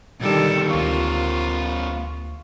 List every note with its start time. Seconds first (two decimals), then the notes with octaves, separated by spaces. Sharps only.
0.21 C2 D3 D#3 G3 A4
0.70 D2 A#3 C4 F4 C#6